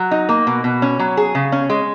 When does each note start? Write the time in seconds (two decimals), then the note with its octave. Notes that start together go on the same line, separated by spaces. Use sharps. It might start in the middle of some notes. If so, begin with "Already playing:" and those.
Already playing: F#3
0.11 D#4
0.29 A#3
0.47 B2
0.64 B2
0.82 C#4
0.99 F#3
1.17 G#4
1.35 C#3
1.52 C#4
1.70 G#3